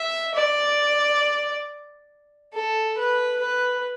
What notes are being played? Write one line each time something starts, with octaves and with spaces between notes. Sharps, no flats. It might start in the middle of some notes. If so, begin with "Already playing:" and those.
Already playing: E5
D5
A4
B4
B4